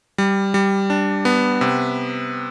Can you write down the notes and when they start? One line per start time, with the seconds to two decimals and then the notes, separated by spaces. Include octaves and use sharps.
0.18 G3
0.54 G3
0.90 D4
1.25 B3
1.61 C3